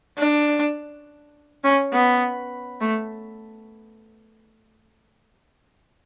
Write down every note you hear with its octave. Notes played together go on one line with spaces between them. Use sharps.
D4
C#4
B3
A3